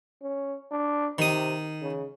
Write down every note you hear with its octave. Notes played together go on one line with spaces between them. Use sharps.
C#4
D4
C3 D#3 D#6
C#3